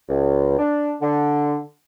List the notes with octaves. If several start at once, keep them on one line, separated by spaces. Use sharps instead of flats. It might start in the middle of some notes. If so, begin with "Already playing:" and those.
C#2
D4
D3